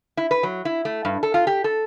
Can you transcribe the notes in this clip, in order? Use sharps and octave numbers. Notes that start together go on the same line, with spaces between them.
E4
B4
F#3
E4
A3
G2
A4
F4
G4
A4